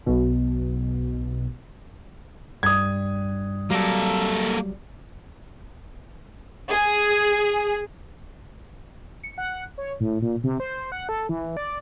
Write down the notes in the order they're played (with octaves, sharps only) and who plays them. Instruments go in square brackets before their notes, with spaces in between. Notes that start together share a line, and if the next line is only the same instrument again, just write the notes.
[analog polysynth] B1 B2
[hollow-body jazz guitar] G2 [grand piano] D#6 G#6
[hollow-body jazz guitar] F#3 G3 [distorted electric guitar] A#3 A4
[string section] G#4
[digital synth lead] C#7
F#5
C#5
A2
A#2
C3
C5
F#5
A4
E3
D5